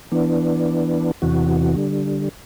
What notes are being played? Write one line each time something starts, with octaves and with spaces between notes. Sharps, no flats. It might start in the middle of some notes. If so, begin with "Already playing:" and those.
E3 B3 D4
E2 C3 E3 F#4
D3 G3